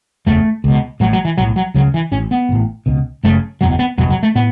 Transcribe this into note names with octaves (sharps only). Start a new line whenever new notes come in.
F#1 E2 C#3 A3
C#2 B2
A1 A2 F#3
F#3
E3
B1 A2 F#3
F#3
C#2 C#3 F#3
E3
A1 A2 C#4
B3
A1 A2
C#2 B2
F#1 F#2 C#3 A3
F#1 E2 B2 F#3
B3
F#1 E2 B2 F#3
F#3
A3
A2 B3